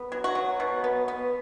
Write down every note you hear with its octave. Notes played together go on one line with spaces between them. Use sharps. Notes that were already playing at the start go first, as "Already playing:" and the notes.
Already playing: B3
F#3
F#4
F#3
B2
B3
B3